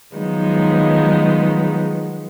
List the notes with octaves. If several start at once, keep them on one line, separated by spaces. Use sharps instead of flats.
D#3 F3 F#3 G#3 B3 D#4